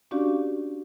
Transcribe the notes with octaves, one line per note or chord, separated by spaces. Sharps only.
C#4 D4 F#4 G4 D5 F5